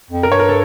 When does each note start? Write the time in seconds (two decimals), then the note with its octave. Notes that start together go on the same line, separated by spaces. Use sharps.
0.10 F2
0.23 A#4
0.30 G2 C#5
0.39 A#4
0.49 A4